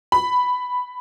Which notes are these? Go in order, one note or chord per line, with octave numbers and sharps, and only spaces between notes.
B5